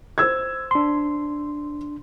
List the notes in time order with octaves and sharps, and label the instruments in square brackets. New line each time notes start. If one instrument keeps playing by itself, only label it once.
[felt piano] C5 E6 G#6
[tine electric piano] D4 C6